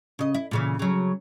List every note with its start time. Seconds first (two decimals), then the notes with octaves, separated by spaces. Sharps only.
0.19 C#3 D#5
0.34 E4
0.51 A#2 C#3 E3
0.79 C#3 F#3